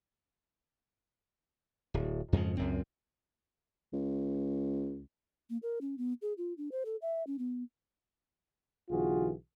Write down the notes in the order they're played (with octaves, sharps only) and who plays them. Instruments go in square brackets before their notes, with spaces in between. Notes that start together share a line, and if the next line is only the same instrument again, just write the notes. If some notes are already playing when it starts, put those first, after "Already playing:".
[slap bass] D1
F2 G#2 C#3 F3
C#2 F#2 C4
[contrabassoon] C#2
[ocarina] A#3
A#4
C#4
B3
G#4
F4
D4
C5
A4
E5
C#4
B3
[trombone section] B1 D3 E3 F4 F#4 G#4